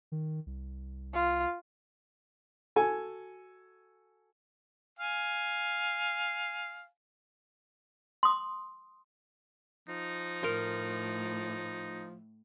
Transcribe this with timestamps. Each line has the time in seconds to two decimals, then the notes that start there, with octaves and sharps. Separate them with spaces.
0.12 D#3
0.46 C2
1.13 F4
2.76 F#4 A4 G#5
4.99 F5 G#5
8.23 C6 D#6
9.89 F3 D#4
10.43 A2 A#4 C6